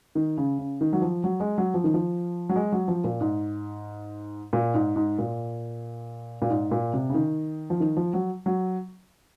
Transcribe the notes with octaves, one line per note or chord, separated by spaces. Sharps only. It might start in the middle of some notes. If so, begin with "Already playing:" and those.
D#3
C#3
C#3
D#3
F#3
F3
F#3
G#3
F#3
F3
D#3
F3
F#3
G#3
F#3
F3
A#2
G#2
A#2
G#2
G#2
A#2
A#2
G#2
A#2
C3
C#3
D#3
F3
D#3
F3
F#3
F#3